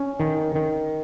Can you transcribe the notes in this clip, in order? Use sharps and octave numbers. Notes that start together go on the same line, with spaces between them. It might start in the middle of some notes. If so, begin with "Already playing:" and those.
Already playing: C#4
D#3
D#3